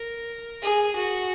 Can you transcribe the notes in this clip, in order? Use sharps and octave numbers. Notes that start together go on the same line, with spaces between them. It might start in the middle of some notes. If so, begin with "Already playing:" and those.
Already playing: A#4
G#4
F#4